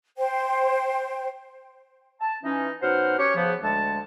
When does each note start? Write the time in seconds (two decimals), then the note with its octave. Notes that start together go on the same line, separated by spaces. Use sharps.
0.17 C5 G5
2.21 A5
2.44 E3 C#4 D#4
2.82 B2 F#3 D#4 C5 F#5 F6
3.19 C#4 G4 C#5
3.36 C#3 F3 B3
3.63 D2 G#3 A5